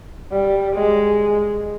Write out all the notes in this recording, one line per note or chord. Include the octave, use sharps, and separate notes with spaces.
G3
G#3